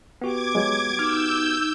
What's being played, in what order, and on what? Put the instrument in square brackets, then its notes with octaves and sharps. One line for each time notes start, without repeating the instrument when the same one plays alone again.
[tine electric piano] B3 F#4 G4 [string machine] D6 G#6
[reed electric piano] F#3 G#3
[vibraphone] D#4 [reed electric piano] D6 F6 G#6 [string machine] E6 G6